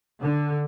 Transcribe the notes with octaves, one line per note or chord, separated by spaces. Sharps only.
D3